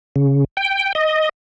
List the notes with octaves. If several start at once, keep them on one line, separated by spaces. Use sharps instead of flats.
C#3
G5
D#5